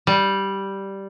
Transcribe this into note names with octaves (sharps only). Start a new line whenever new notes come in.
G3